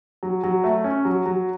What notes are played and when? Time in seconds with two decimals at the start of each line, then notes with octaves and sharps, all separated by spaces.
0.23 F#3
0.44 F#3
0.64 A3
0.84 C#4
1.05 F#3
1.26 F#3